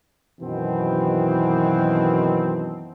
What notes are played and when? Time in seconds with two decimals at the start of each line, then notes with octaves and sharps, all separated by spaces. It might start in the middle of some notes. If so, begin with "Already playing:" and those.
0.41 F#2 B2 D#3 E3 C4